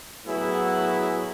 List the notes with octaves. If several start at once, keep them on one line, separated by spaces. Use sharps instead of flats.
A2 F#3 B3 E4 G#4